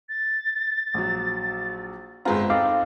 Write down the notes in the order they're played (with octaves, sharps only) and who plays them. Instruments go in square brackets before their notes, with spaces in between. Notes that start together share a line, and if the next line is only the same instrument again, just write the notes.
[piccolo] A6
[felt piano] A#1 F#3
[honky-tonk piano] G1 G#3 A#5 [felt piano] B3 C4 F4
[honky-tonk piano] C4 [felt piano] D#4 A4 [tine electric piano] F5 D6